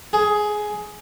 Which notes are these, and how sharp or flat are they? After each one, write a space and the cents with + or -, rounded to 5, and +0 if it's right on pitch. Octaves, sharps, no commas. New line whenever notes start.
G#4 +10